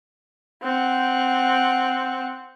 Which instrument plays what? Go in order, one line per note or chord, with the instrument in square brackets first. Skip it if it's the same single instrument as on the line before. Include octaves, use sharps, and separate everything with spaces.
[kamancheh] C4 F#5